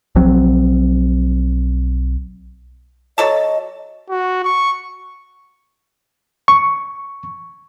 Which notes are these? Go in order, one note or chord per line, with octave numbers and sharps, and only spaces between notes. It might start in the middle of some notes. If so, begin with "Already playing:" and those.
B1 F3 F#3 C4
F#3 A4 D#5 A5
F#4
C#6
C#6